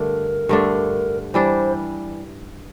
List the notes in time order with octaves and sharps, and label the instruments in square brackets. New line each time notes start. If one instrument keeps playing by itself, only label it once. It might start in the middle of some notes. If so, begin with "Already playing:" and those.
Already playing: [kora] G2 D3 A3 D4 [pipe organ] A#4
[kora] G2 D3 A3 D4
[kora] E3 G3 D4 [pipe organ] C5